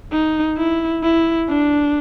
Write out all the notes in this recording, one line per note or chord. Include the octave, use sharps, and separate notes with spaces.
D#4
E4
E4
D4